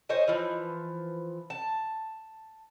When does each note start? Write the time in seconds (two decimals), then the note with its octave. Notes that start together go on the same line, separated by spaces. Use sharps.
0.09 C5 C#5 D#5 G#5
0.28 E3 F3
1.50 A5